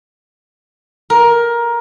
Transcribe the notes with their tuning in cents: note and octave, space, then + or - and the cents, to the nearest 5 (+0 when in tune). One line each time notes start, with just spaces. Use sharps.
A#4 +15